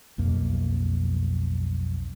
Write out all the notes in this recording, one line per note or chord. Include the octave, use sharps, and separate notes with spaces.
B1 F2 A#3